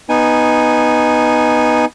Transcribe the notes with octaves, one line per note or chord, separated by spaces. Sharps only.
B3 D#4 G#5